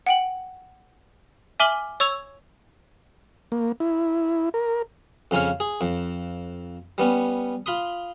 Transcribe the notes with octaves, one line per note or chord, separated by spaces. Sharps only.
F#5 G5 F#7
E5 G#5 D6 F6 F#7 G7
C#5 C#6 E6 G#6 F7
A#3
E4
A#4
F2 C#3 C#4 C#5 F5
G#4
F2
G3 B3 C#4
F4 B5 C6 D#6